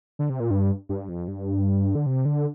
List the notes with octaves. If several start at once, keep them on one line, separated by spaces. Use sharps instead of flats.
D3
C3
A#2
G2
G2
F2
G2
D3
C3
D3